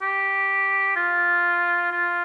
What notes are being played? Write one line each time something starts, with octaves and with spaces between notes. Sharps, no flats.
G4
F4
F4